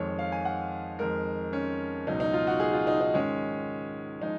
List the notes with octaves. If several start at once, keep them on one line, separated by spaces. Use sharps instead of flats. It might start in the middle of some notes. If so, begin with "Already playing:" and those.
Already playing: F2 D#3 G#3 C#5
F5
G#5
F#5
F2 D#3 G#3 A#4
C#4
C#2 B2 F#3 D#4
D#4
F4
F#4
G#4
F4
D#4
D#4
G#2 D#3 G#3 C#4
F3 G#3 D#4